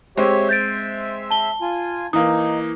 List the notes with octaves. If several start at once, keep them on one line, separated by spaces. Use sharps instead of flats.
G#3 C4 G4 C#5 E5
E5 G6 A6 D7
A5 G7
F4 G#5
E3 A#3 D#4 D#6